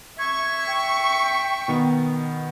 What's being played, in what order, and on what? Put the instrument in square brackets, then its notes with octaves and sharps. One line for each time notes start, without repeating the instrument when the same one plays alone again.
[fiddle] E5 C#6 [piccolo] G#6
[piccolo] G5
[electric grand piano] B2 D#3 B3